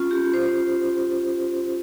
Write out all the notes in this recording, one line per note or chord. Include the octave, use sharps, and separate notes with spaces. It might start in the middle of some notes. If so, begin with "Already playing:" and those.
Already playing: C#4 F4
G4
C5